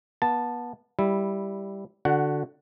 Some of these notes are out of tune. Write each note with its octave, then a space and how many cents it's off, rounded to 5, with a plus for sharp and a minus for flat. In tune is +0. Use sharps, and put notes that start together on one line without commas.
B3 -30 A5 +0
G3 +0 E4 +0
D3 +0 F#4 -10 F#5 +15